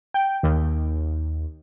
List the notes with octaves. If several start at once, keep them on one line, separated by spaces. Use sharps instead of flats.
G5
D#2